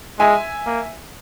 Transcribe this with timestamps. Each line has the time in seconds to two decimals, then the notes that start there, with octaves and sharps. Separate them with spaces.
0.20 G#3 E5 G#5
0.66 A#3